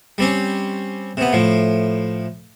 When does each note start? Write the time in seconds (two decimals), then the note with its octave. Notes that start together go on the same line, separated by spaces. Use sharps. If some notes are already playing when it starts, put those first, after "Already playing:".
0.18 G3 C4 C#4
1.17 C3 B3
1.33 A2 F3